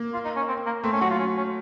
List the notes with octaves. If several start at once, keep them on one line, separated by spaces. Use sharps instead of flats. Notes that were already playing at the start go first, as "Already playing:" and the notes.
Already playing: A#3
F4
D#4
C#4
C4
A#3
A3 C4
C#4
F#3 F#4
F4
C#4
C#4